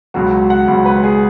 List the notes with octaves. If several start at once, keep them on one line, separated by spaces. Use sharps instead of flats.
C#2 B2 F#3 F#4
F#5
C#2 B2 F#3
B4
G#4